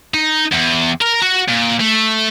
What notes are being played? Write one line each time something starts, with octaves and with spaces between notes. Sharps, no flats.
D#4
E2
A#4 A#5
F#4
A#2
A3